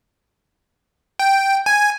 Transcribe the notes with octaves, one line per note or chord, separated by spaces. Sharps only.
G5
G#5